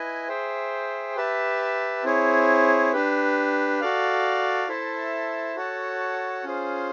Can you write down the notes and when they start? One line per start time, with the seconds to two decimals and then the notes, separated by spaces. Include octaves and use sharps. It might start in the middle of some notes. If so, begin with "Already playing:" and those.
Already playing: E4 B4 D#5 G#5
0.28 G#4 C5 E5 G5
1.16 G4 B4 E5 A5
2.04 C4 E4 G#4 C#5
2.93 D4 G4 B4
3.80 F#4 A4 D5 F5
4.68 E4 A4 C5 E5 A5
5.56 F#4 A4 C#5 F#5 A5
6.44 C#4 F4 G#4 C5